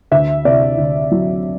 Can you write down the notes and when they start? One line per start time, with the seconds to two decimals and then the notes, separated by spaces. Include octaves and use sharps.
0.11 D2 E5
0.45 C3 D5
0.78 D2
1.11 F#3